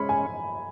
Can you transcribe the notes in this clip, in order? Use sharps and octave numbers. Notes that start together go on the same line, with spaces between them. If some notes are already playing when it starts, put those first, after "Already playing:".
Already playing: G#3 C#4 B5
G#5